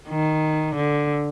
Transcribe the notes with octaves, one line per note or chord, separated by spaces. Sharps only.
D#3
D3